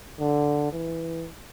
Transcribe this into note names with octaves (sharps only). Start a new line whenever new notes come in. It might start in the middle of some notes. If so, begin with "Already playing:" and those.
D3
E3